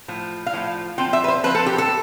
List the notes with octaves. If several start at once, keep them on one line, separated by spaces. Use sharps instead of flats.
A2 F3
F5
A2 F3
F3 C4 F4 G5
E5
B4
C5
F3 C4 F4 B4
A4
G4
A4